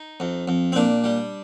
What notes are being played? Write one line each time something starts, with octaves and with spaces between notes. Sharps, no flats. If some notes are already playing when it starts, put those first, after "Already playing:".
Already playing: D#4
F2
F2
C4
A#2 D4
G3